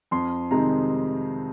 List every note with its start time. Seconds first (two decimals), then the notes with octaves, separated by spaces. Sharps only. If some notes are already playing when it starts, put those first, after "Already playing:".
0.11 F2 C6
0.51 C3 D#3 G#3 A#5